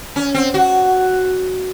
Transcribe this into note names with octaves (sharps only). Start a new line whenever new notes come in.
C#4
C4
F#4